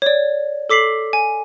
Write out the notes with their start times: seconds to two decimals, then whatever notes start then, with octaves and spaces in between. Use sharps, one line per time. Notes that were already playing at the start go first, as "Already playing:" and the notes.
0.02 C#5 D5
0.70 A4 D6 B6 C7 F#7
1.13 G#5